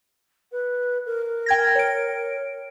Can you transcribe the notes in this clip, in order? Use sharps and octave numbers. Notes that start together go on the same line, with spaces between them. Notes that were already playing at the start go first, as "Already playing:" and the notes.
B4
A#4
G5 G#6 A#6
C#5 D7